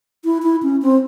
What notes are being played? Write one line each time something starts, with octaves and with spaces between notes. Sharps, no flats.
E4
E4
C#4
C4